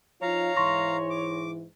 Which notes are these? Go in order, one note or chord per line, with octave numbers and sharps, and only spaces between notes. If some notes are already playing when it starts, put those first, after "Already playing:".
F3 D#4 F4 C#5 F5 A#5
G#2 E3 C6 C#6 A#6
D6